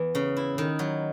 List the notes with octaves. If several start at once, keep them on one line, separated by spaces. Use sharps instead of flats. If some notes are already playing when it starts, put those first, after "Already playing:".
Already playing: E2 B4
C#3
E4
D#3
F#3